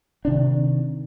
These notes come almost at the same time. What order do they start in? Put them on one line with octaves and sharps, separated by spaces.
D4 C3 D#3